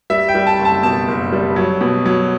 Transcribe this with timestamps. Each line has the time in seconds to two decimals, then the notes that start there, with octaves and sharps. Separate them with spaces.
0.10 G3 E5
0.28 G5
0.35 G3
0.47 A5
0.59 F#1
0.65 A5
0.83 B2 A5
1.08 F#1
1.32 G3
1.56 F#3
1.81 B2
2.06 F#3